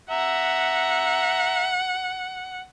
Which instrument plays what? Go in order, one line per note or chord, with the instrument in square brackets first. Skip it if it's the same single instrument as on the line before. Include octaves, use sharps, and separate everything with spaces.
[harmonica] E5 A#5 [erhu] F#5